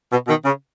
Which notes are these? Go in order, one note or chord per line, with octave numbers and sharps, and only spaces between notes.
B2
B2 D#3
C#3